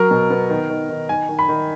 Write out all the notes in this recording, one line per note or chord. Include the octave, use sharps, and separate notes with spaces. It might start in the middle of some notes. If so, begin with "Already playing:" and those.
Already playing: F#3 A#4
B2
B3
D#3
D#3
D#3
D#3 G#5
D#3
B5
D#3